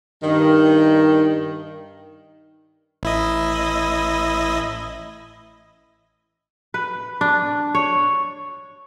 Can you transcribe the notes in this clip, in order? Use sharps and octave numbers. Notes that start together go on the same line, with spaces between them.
G2 D#3
A1 E4 D#5
B4
D4
C#5